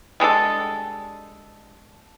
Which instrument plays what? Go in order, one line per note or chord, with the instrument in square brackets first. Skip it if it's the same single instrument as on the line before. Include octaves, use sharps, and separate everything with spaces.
[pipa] G3 G#3 D4 A4